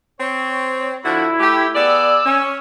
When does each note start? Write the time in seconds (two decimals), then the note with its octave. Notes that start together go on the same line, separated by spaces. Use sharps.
0.20 C4 C#5
1.04 D3 F3 E4 F#4
1.40 A3 G4
1.76 B3 G#4 D5 E6
2.25 C#4